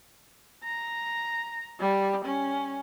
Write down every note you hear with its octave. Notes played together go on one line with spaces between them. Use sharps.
A#5
G3
C#4